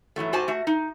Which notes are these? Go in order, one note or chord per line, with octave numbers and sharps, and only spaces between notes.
G#2 E3 F#3 A3
G#2 F#4 G4 C5 G#5 A5
A3 F#4
D#4